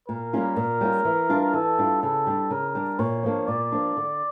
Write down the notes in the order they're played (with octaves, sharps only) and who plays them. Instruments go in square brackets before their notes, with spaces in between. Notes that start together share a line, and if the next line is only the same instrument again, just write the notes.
[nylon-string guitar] A#2 [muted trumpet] A#4
[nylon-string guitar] G3 A#3 C#4 F4
A#2
G3 A#3 C#4 F4
E3
G3 D4 F4
[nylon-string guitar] E3 [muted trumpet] A4
[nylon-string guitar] G3 D4 F4
[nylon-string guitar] C#3 [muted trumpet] A4
[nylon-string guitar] G3 D4
[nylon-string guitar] C#3 [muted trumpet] A#4
[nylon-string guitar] G3 D4
[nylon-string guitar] A#2 [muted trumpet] C#5
[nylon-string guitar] F3 A#3 D4
[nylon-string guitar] A#2 [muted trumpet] D5
[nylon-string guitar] F3 A#3 D4
D3